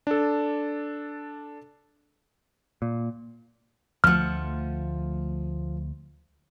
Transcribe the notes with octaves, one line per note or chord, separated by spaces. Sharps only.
D4 A4
A#2
D2 F3 A3 F#5 F6